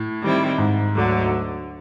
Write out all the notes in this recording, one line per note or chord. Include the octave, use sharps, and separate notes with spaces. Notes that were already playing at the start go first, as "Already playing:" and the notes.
Already playing: A2
D#3 G3 C4 E4
G#2
D2 D3 F#3